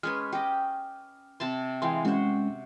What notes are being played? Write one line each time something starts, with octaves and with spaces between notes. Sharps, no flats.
G#3 C#4 B4 F6
G4 D#5
C3 A5 C6
E3 G#3 F5 G5 G#5 C6
G#3 C#4 F#4 C5